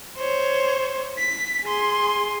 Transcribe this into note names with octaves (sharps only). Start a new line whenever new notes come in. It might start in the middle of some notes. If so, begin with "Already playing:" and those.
C5 C#5
B6
G#4 C6